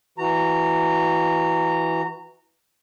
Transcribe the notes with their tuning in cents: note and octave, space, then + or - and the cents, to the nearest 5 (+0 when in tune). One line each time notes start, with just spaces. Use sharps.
E3 +0 F#4 +0 A#5 -20